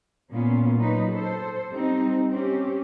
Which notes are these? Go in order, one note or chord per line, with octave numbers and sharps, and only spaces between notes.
A#2 B3 C#4 F4
F#3 D#4 B4
A4 C5
G3 C4 D#4
C4 C#4 G4